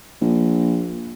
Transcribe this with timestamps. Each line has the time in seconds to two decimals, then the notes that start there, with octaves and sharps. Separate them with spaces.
0.21 A#1